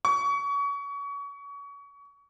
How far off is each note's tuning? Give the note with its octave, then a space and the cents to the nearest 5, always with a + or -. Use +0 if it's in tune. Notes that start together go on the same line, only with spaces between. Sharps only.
C#6 +30